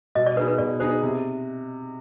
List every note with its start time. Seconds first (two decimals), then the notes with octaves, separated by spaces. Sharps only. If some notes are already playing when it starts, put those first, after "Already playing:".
0.15 B2 D#5
0.27 D5
0.36 B3 D#4 G#4 B4
0.48 B4
0.58 B2 D5
0.80 B3 D#4 G#4 C5
1.02 C3